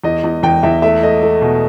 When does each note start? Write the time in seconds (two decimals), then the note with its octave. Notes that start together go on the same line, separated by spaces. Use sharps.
0.04 E2 D#5
0.24 E2
0.43 E2 G5
0.63 E2 E5
0.82 A3 E5
1.02 A3 D#5
1.22 A3
1.42 B2